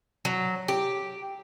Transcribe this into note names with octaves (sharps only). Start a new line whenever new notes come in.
F#3
G4